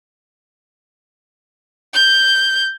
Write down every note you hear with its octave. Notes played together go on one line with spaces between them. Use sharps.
G6